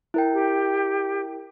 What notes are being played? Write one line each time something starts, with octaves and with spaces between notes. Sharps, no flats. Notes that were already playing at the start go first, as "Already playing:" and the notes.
E4 A#4 G5
G4